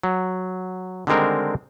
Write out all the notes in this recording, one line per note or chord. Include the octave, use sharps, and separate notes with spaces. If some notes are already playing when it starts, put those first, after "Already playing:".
F#3
D3 D#3 G3 G#3 C4 A#4